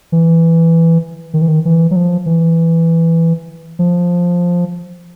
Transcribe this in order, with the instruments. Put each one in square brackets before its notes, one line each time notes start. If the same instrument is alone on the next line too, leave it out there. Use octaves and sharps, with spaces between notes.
[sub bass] E3
D#3
E3
D#3
E3
F#3
F3
E3
F3